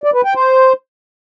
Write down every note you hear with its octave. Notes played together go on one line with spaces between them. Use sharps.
D5
B4
G5
C5